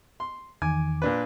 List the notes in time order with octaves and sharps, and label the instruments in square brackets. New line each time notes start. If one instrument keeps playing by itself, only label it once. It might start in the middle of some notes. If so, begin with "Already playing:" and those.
[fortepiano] C6
[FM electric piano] E2 D#3 D6 [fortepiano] G#5
[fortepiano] A#2 D4 B4